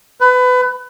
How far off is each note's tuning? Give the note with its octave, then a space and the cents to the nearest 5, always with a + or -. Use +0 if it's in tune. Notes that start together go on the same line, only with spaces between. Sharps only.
B4 +25